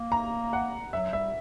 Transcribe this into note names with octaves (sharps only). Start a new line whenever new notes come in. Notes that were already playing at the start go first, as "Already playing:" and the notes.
Already playing: A#3
A#5
F#5
F#3 E5
G3 E5